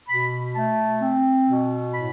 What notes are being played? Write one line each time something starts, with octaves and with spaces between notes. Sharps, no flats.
B2 B5
A3 A5
C4
B2
A2 B5